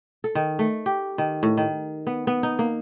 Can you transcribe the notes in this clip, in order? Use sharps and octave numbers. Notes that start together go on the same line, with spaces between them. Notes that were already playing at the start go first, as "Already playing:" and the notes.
A4
D#3
A3
G4
D#3
A2
D#3
B3
B3
D#4
A#3